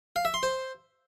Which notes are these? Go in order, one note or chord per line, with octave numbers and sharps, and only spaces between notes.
F5
E5
C6
C5